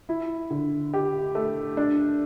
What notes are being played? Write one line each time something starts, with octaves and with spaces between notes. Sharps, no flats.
E4
D3
G4
A3
D4